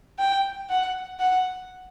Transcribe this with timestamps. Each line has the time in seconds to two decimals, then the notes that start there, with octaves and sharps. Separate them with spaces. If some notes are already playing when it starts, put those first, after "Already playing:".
0.19 G5
0.69 F#5
1.20 F#5